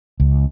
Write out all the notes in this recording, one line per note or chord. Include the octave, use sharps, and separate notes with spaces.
C#2